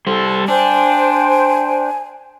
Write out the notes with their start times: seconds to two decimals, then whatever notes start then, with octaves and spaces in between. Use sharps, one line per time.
0.07 G3 A4 C5
0.48 D4 C5 G5 G#5